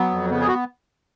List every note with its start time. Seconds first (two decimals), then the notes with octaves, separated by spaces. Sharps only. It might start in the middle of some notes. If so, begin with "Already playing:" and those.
Already playing: F#3 B3
0.11 F2
0.30 C#3 B3
0.40 G#4
0.47 F#4